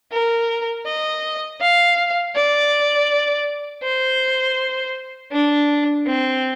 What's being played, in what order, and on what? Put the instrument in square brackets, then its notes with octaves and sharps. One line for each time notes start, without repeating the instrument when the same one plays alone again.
[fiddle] A#4
D#5
F5
D5
C5
D4
C4